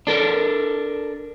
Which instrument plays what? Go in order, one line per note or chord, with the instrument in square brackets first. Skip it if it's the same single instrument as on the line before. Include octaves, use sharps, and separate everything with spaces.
[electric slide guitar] D4 A4 A#4